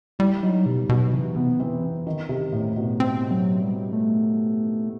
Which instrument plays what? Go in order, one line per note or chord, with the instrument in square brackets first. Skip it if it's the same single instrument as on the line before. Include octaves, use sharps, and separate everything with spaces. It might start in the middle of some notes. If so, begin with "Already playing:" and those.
[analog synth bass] G3 [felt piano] E4
[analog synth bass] F#3 [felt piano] D#4
[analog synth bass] B2 [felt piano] G3
[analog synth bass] B2 [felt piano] F#3
[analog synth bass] C3 [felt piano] E3
[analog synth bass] B3
[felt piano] E3 [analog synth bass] C4
[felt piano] D#3
C3
A2
B2
[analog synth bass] C4
F#3
G3
A3